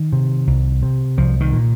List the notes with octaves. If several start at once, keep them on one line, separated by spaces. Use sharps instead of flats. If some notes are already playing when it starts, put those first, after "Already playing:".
Already playing: D#3
C3
C2
C3
C2 F3
D#3
A#2